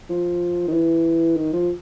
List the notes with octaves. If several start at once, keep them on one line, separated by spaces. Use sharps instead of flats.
F3
D#3
E3
D#3
F3